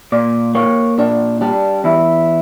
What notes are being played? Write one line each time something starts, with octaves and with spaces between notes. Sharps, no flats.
A#2 D5
A#3 C#5
A#2 D4
G3 D4
E2 E4